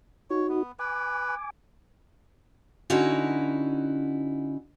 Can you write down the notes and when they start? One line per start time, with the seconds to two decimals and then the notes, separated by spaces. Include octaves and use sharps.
0.30 D#4 F#4 C#5
0.49 B3
0.79 B4 G#5 D6
2.90 D3 C#4 D#4 E4 F#4